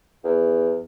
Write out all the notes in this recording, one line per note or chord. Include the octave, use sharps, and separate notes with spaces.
E2